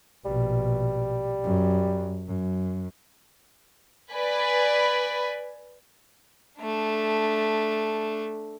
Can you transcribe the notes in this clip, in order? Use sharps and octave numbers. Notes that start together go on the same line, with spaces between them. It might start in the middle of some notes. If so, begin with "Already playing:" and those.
A#1 B2 G3
F#2
F#2
B4 D5 G#5 B5
A3 D4